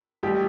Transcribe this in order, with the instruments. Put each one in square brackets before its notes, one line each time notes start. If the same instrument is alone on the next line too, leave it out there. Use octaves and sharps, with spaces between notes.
[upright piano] A1 G3 G4